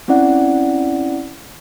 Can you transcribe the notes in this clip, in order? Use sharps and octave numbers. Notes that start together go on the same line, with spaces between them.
C4 C#4 E4 D5 F#5